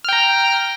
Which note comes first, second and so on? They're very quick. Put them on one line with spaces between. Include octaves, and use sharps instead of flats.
F6 G5 A#5